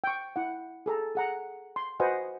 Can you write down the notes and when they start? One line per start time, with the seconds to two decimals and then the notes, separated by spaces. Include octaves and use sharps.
0.04 G5 C#6
0.36 E4 F#5
0.86 G#4 A4 A#5
1.15 G#4 F#5 A#5
1.76 C6
2.00 F#4 B4 C5 D#5 F#5 G#5